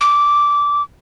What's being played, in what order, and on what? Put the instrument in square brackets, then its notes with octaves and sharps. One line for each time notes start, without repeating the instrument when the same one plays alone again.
[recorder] D6